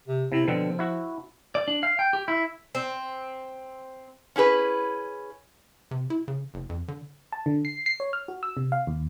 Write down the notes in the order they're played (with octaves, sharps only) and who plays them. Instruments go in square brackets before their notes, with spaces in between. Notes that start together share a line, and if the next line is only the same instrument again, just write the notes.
[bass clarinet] C3
[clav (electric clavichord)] C3 [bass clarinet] E4
[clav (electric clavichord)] B2 D3 C4 [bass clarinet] F3
[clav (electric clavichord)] E4 F#4
[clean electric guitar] D5
D4
F5
G5
G4
E4
[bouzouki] C4
[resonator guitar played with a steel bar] C#4 E4 G#4 B4
[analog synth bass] C3
E4
C#3
F#1
F2
D3
[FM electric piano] A5
D3
C7
C7
C#5
F6
F#4
E6
C3
F5
D#2